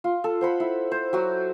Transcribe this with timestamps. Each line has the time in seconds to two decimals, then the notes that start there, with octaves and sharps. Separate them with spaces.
0.04 F4
0.24 A4
0.41 C5 F#5 B5
0.60 E4
0.92 C5
1.13 F#3 F#4